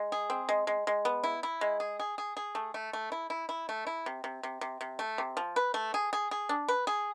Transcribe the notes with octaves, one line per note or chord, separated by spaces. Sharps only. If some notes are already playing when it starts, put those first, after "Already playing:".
Already playing: G#3
G#4
C4
G#3
G#3
G#3
B3
E4
E4
G#3
G#4
G#4
G#4
G#4
A3
A3
A3
E4
E4
E4
A3
E4
C3
C3
C3
C3
C3
A3
C3
F3
B4
A3
G#4
G#4
G#4
D4
B4
G#4